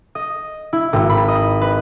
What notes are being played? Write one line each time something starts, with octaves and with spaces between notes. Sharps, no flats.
D#5
E4
G#1
B5
D#5
B4